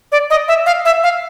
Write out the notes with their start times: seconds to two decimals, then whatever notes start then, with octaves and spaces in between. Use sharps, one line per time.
0.12 D5
0.30 D#5
0.48 E5
0.66 F5
0.85 E5
1.03 F5